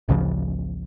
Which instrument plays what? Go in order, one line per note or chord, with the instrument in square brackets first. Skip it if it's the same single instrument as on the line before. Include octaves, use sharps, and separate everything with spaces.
[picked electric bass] A1 D2 C#3 F3